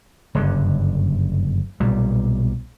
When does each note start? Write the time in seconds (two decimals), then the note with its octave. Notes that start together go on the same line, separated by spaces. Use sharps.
0.35 F#1 G2 D3
1.80 B1 A#2 G3